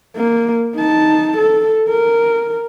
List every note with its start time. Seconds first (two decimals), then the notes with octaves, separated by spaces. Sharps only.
0.17 A#3
0.76 D#4 A5
1.38 A4
1.89 A#4